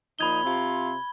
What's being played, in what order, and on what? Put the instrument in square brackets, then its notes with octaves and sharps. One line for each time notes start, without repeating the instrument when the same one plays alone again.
[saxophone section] A#2 F3 D#4 [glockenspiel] B5 G#6 G7
[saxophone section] C3 C4 F4